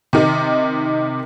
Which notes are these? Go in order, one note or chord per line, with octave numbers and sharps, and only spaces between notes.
C3 D#3